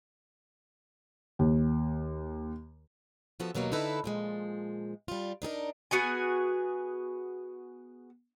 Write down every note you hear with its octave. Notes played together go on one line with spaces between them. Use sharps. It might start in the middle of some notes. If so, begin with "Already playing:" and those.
D#2
C#3 F3 B3 F#4 A4
D#2 B2 F#3 A#3 C#5
D3 D#4 E4 A4 B4
A#2 F3 G#3
G3 F4
D4 D#4 G#4 A#4
B3 F#4 G#4 G#5